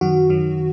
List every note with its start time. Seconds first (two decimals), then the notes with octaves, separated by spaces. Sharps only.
0.01 F#2 D#3 F#3 F#4
0.29 F#2 D#3 F#3